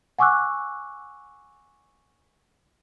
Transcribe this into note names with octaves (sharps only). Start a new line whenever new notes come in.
F#5 G#5 C#6 D6 E6 F#6